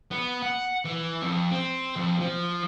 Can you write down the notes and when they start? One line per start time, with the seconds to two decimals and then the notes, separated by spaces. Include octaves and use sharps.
0.11 B3
0.42 F#5
0.85 E3
1.22 F2
1.51 C4
1.96 F2
2.21 F3